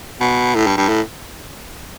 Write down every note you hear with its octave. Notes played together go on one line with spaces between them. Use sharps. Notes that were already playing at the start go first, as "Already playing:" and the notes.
B2
A2
G2
G2
A2